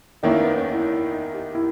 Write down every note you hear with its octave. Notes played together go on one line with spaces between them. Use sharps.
E2 D#3 A#3 C#4 E4
B3
C#4
E4
E4
D#4
G4
E4